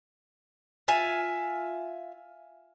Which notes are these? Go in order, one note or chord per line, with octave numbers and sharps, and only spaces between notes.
F4 E5 G#5